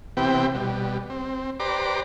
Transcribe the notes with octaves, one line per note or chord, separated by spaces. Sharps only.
C3 E3 B3 C4 G4 G5
B2 G3
C4
G4 B4 C5 D5 A#5 D6